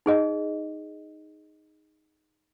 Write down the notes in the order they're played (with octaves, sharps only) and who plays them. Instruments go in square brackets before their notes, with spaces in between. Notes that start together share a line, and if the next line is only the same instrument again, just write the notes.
[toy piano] D#4 G#4 D#5